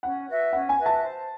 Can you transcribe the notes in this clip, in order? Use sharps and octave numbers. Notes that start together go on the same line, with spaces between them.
C#4 F#5
F#4 B4 E5
C#4 F#5
G#5
F#4 B4 E5
A5
C5